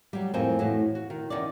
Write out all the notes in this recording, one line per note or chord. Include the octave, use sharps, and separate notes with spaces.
F#3 G3
F2 A2 C4 A#4 C5 G#5
A2 E3 F#4
F#4
D#3
E2 D#3 C#4 D#4 D5